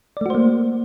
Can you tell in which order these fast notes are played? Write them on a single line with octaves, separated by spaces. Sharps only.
D5 A3 F#4 C5 A#3